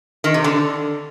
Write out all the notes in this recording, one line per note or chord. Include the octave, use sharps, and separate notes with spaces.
D#3
C3
D3